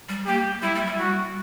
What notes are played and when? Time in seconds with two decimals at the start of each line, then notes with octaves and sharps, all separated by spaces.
0.09 G3
0.26 A#3 G4
0.62 G3 E4
0.75 G3
0.86 G3
0.99 G3 F#4